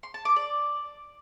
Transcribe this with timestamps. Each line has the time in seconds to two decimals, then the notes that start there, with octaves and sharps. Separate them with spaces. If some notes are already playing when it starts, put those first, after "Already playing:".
0.03 C6
0.14 A5
0.25 D6
0.36 D5